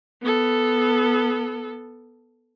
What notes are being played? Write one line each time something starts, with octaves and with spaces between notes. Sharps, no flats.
B3 A4